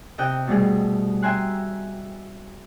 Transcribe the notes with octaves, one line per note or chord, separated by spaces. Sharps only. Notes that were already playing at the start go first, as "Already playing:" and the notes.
C3 D#5 G5 F#6 G6
B2 G3 A3 G#4
E5 G5 G#5 A#5 C6 F#6